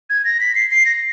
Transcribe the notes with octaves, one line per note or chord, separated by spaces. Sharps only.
G#6
A#6
B6
C7
C7
A#6